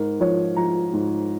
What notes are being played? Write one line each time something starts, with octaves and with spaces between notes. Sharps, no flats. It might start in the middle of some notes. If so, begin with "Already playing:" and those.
Already playing: G#2 A#4
F3 C#5
F3 A#5
G#2